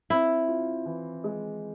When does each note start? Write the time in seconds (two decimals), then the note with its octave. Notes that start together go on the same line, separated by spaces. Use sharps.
0.10 C4 E4
0.48 F4
0.85 E3
1.24 G#3